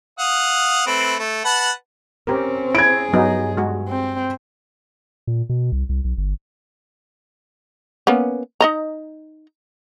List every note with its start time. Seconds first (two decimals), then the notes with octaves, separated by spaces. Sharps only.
0.19 F5 F#5 D#6
0.87 A3 C4 B4
1.19 A3
1.45 B4 F#5 A5
2.27 C4 C#4 G4 A#4
2.75 E4 G#4 G#6 D7
3.13 G2 F#3 B3 D#4
3.57 G#3 F#4
3.88 C4
5.27 A#2
5.49 B2
5.72 C2
5.89 C2
6.04 B1
6.18 G1
8.07 A#3 B3 C#4
8.61 D#4 D#5 A#5